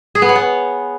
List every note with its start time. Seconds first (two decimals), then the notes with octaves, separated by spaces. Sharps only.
0.15 G#4
0.22 B3
0.29 C#5
0.35 B3